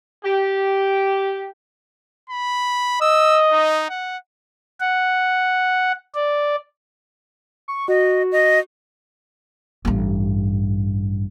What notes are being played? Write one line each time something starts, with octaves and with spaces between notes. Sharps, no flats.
G4
B5
D#5 E6
D#4
F#5
F#5
D5
C#6
F#4 D#5
D#5
A1 G2